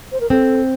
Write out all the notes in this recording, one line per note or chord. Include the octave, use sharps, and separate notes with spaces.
C5
A#4
C4 A4